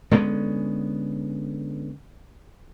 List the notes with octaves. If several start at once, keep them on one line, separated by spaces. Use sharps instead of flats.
D3 G#3 B3 C#4